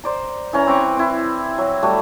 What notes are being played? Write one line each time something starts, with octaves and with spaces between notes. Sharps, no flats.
C5 D5 A#5
E3 C#4 A#5
C4 B4 C#6 D6
C4 E4
F#3
G3 A3 F#4